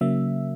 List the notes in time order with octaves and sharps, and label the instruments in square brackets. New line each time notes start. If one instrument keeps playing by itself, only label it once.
[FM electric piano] C#3 F#3 A#3 E5